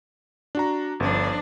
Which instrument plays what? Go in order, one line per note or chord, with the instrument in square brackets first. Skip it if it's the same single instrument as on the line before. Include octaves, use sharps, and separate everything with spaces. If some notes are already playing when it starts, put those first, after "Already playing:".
[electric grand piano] D4 F#4 A#5
[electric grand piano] G1 [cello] F3 D4